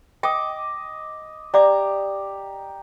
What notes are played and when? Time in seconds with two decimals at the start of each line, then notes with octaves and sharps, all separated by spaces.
0.23 D#5 G5 D6
1.54 G4 D5 E5 A#5 D6